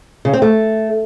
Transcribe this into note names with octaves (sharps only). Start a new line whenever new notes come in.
C#3
C4
A3